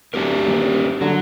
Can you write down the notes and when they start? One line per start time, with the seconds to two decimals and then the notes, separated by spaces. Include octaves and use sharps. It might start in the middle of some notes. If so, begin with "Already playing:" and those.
0.14 D1 D4 G4 A#4
0.45 D#1
1.01 D3 F#3